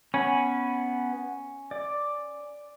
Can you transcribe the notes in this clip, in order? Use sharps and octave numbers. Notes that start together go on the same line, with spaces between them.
B3 C#4 G#5 B5
D5